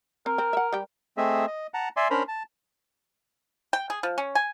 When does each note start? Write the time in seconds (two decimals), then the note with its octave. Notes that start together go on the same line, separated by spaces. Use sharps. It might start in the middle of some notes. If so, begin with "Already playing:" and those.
0.26 C4 A#4
0.38 C4
0.53 E5 F#5
0.73 G3 G4
1.17 A3 C4 G#4 D#5 E5
1.47 D#5
1.74 F#5 A5 A#5
1.97 D5 E5 G#5 C6
2.10 C#4 D4 A#4 C5 A#5 B5
2.28 A5
3.73 G5
3.90 G#4
4.03 F3
4.18 C#4
4.35 G#5